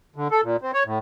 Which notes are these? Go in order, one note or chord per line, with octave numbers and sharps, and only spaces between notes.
D3
A4
A#2
C4
C#5
A2